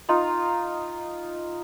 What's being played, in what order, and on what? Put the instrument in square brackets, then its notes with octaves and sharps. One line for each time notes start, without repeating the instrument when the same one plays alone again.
[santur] D#4 F4